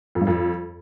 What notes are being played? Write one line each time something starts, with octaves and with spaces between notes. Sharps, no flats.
F2
G2
F2